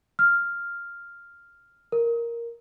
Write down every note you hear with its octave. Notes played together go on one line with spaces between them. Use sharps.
F6
A#4